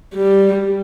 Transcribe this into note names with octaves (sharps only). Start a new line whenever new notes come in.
G3